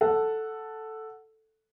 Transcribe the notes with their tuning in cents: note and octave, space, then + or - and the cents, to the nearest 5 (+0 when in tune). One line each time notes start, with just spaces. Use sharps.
A4 +0 F#5 +0